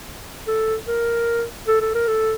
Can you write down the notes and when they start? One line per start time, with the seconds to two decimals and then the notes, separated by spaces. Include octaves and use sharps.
0.47 A4
0.87 A#4
1.67 A4
1.81 A4
1.95 A#4
2.07 A4